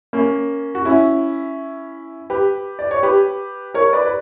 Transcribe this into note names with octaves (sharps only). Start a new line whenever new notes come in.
A#3 C#4
F#4
C#4 E4
G4 B4
D5
C#5
G4 B4
A#4 C#5
B4 D5
B4